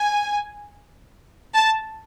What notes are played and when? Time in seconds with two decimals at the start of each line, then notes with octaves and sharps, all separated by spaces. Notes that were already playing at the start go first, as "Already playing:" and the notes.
Already playing: G#5
1.53 A5